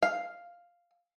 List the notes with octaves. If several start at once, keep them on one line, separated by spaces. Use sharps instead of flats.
F5